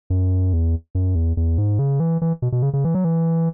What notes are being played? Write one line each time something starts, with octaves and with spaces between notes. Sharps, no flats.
F#2
E2
F#2
E2
E2
G#2
C#3
E3
E3
B2
B2
C#3
C#3
E3
F#3
E3